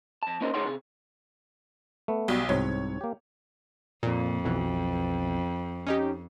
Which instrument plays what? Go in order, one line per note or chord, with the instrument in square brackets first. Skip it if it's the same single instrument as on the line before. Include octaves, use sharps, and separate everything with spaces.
[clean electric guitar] F2 A5
A#3 C#4 D#4 A#4 C5
D2 D#4 G#4 C#5 F#5 C6
C3 G#4
[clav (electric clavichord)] A3 B3
[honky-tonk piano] B1 [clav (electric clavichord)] G3 F#4
[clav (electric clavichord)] C2 G#2 C4 [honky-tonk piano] C#5
[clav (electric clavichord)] A#3 G4
[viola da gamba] F2 [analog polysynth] A#2
[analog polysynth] B1 B2 E3
C#4 D#4 G4